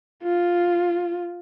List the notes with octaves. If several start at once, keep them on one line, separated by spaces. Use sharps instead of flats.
F4